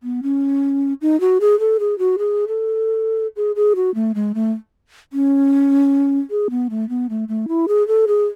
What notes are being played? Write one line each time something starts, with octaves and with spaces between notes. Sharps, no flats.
B3
C#4
D#4
F#4
G#4
A4
G#4
F#4
G#4
A4
G#4
G#4
F#4
A3
G#3
A3
C#4
G#4
B3
A3
B3
A3
A3
E4
G#4
A4
G#4